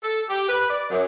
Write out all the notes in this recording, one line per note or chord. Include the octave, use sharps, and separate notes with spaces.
A4
G4
B4
D5
F#2